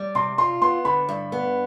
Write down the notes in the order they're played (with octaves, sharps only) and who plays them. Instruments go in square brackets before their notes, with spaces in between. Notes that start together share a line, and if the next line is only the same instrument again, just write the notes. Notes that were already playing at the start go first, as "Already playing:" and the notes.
Already playing: [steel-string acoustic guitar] G3
[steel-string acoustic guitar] C3 [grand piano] C6
[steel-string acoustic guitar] F4 [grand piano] C6
[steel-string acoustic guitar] B3 [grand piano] C6
[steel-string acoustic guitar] D3 [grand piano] B5
[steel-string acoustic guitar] G2
B3